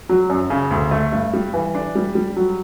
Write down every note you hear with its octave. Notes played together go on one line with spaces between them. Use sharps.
F#3
F#2
C#3
D2
A3
G2
G3
E3
D4
G3
G3
F#3